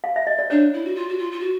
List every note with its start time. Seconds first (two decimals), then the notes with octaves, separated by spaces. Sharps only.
0.04 F5
0.16 E5
0.27 D#5
0.39 D5
0.50 D4 C#5
0.73 E4
0.85 F#4
0.95 F4
1.08 F#4
1.18 F4
1.31 F4
1.40 F#4